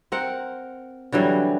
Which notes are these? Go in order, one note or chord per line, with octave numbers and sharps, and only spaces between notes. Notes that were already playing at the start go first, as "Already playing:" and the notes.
C4 A#4 F#5
D3 E3 F#3 G3